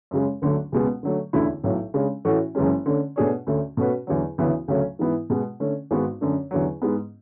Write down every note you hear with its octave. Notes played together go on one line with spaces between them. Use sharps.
F#2 C#3 G#3
D2 D3 F#3 A3 D4
C#2 B2 G#3 B3
D3 F#3 A3
E1 D2 D3 A3 E4
B1 A2 F#3
C#3 G#3 D4
A2 E3 A3 C#4 F#4
F#1 F#2 E3 G#3 C#4
D3 A3 C#4
B2 A3 D4 G#4 C#5
D2 D3 A3 C#4
B2 A3 C#4 F#4 B4
E2 D3 F#3
D2 C#3 E3 B3 F#4
D2 C#3 F#3 A3 C#4
G#2 E3 B3 E4
B2 G#3 B3
D3 A3 C#4
G#1 G#2 G#3 B3 F#4
F#2 D3 A3 D4
E2 D3 F#3
G#2 G#3 B3